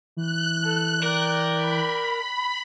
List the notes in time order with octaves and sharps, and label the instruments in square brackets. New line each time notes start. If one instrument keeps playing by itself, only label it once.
[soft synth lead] E3 [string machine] F#6
[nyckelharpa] A4
[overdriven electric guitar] A#4 [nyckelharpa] D5 G5
[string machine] B5